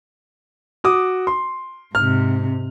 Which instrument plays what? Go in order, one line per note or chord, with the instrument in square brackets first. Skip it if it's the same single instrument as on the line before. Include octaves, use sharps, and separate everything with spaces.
[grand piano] F#4 D6 D#6
C6
[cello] G#2 C3 [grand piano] F6